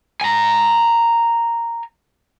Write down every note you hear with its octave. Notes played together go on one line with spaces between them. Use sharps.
G#5 A#5